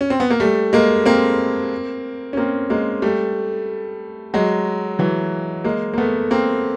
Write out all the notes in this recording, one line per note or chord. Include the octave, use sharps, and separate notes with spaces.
C#4
C4
B3
A#3
G3 A3
G#3 A#3
A#3 C4
C#4
A#3 C4
G#3 A#3
G3 A3
F#3 G#3
E3 F#3
G#3 A#3
A#3
A3 B3
A#3 C4